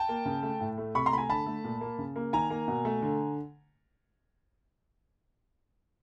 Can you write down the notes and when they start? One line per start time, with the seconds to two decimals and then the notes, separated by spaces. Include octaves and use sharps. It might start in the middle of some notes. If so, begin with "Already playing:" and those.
Already playing: G5 A5
0.09 A#3
0.26 C#3
0.43 A3
0.60 A2
0.78 A3
0.95 C3 B5 C#6
1.06 A#5 C6
1.12 A3 B5
1.18 G#5 A#5
1.29 D3 A5 B5
1.46 A3
1.64 A#2
1.81 A#3
1.99 C#3
2.16 A#3
2.33 D#3 G#5 A#5
2.50 A#3
2.68 B2
2.85 A3
3.02 D3